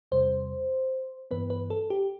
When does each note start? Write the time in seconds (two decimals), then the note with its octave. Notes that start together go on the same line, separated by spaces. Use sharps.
0.12 E2 C3 G3 C5
1.31 G2 E3 B3 B4
1.50 B4
1.70 A4
1.90 G4